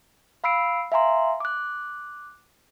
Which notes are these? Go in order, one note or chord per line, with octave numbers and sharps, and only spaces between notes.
F5 B5 E6 C7 D7
E5 F5 G#5 A#5 C6
D6 F#6